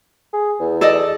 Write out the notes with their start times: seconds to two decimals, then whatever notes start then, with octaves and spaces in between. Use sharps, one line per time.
0.33 G#4
0.60 E2
0.81 A4 D5 D#5